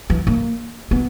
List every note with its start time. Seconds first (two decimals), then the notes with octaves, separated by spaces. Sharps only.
0.10 E3
0.27 A#3
0.91 B3